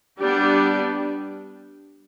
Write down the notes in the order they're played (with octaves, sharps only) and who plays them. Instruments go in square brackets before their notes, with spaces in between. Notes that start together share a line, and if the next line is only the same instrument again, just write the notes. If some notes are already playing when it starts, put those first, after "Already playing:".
[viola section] G3 B3 D4 G4